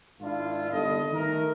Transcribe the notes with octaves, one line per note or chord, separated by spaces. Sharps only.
G#2 D#3 D4 E4 F4
G1 C2 A4 D#5
D#3 A3 A#4